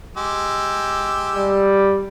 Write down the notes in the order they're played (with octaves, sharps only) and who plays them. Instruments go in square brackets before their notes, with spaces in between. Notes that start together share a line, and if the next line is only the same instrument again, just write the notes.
[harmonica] G#3 G4 E6
[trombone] G3